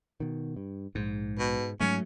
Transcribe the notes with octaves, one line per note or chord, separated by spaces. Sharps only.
B2 D#3
G2
A#1 G#2 G#3
B2
G#2 F#3 A3 C#4